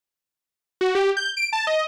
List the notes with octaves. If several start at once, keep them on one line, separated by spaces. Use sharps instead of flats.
F#4
G4
G6
D7
A5
D#5